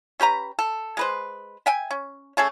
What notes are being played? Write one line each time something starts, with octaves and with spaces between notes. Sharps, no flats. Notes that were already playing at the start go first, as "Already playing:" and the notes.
C#4 G4 B4 A#5
A4
G#3 B4 C5
E5 G5 G#5
C#4
A3 C#4 G#4 A4